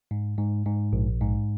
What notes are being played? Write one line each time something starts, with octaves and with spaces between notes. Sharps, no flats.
G#2
G#2
G#2
A#1
G#2